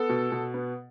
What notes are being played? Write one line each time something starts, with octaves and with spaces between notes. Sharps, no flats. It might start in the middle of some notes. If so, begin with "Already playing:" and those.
Already playing: B3 A4
B2
B2
B3